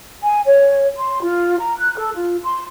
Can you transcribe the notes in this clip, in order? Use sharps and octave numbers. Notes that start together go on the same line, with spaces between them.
G#5
C#5
C6
F4
A#5
F#6
A4
F4
C6